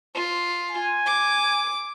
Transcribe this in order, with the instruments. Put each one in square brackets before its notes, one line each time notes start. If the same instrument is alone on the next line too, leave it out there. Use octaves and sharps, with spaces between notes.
[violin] F4
[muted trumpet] G#5
[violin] D6